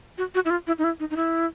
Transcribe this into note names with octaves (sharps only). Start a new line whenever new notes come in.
F#4
F#4
E4
F4
E4
D#4
E4
D#4
D#4
E4